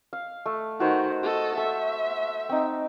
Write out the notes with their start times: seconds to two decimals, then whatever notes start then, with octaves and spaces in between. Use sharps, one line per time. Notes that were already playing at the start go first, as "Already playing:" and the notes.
0.13 F5
0.46 A3
0.80 D#3 F#4 C5
1.23 A4 D#5
1.57 A4 E5
2.49 C4 D#4